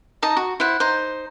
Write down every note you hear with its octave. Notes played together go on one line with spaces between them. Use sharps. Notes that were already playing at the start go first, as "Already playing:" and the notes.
D#4 A5 A#5 D#6
F#4
E4 C5 F#5
D#4 C5